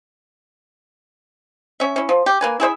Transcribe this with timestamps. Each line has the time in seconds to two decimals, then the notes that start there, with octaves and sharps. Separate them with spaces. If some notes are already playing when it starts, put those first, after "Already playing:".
1.80 C#4 E5
1.96 C#4 E4
2.09 F3
2.26 G4
2.41 A#3 B4 G#5
2.60 E4 G#4 C5 E5